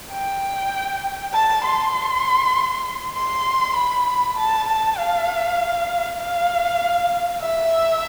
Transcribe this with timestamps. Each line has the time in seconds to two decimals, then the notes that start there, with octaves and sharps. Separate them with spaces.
0.12 G5
1.34 A5
1.64 C6
3.15 C6
3.76 B5
4.37 A5
4.68 A5
4.98 F5
6.19 F5
7.41 E5